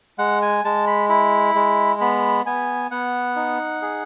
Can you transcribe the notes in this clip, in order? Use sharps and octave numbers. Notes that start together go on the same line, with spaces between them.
G#3 F#5
G#5
G#3 A5
B5
E4 B5
G#3
B3 B5
B3 G#5
B3 F#5
D#4
G#4